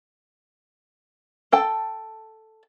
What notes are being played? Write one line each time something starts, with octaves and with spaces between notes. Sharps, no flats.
A4 G5 A5